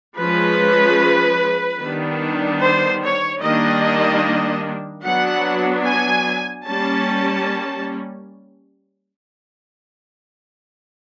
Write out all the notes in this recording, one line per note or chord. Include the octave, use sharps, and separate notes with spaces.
F3 G#3 C#4 B4
D#3 G3 B3 D4
C5
C#5
D#3 G3 A#3 D4 D#5
F#3 B3 D4 F#5
G#5
G3 A#3 C#4 A5